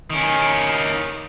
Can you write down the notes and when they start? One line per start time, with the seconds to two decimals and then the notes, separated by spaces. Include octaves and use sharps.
0.10 D#3 C#4